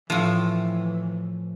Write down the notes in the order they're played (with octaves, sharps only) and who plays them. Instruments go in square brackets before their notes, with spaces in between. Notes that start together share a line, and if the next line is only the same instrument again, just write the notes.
[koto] A2 F3 [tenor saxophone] E3